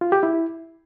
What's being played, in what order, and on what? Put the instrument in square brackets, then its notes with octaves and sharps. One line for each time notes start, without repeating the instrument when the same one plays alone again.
[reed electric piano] F4
G4
E4